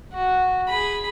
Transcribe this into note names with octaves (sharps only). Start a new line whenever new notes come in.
F#4
G#4 B5